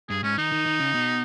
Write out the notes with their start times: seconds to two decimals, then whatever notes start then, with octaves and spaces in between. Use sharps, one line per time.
0.09 G2 G#4
0.24 G#2 C#4
0.38 D#3 D#4
0.52 D#3
0.66 D#3
0.80 C#3
0.94 B2